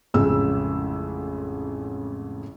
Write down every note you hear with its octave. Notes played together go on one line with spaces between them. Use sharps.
A1 F2 C#3 G#3 E6